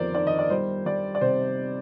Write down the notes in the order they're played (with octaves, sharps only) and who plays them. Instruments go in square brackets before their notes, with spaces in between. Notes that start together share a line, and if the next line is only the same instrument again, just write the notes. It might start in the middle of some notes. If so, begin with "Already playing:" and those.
Already playing: [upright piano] G1 F2 D#3 A#4 C5 D5
D#3 D5
D#5
D5
G3 C5
G3 D5
D5
C3 C5